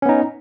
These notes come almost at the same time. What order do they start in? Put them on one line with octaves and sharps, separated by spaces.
C#4 B3 D#4